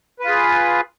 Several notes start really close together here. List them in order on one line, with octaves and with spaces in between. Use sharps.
B4 F4 G#4